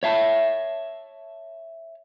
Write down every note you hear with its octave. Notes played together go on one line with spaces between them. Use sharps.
C#5 E5 A5